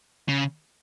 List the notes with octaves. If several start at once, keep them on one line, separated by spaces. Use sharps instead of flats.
C#3